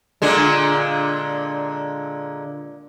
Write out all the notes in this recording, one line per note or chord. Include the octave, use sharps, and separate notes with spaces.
A#2 D3 G#3